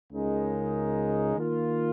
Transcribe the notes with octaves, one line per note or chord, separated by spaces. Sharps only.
C#2 C#3 G#3 D#4 A#4
D#3 A#3 F4